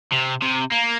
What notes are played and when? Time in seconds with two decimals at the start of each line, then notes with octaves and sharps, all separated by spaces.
0.13 C3
0.42 C3
0.72 A#3